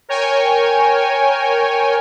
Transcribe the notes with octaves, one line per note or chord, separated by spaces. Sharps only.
A#4 C#5 G5 G#5